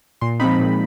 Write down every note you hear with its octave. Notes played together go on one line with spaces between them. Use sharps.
A#2 C6
F3 G#3 C4 D#4 B5
A#2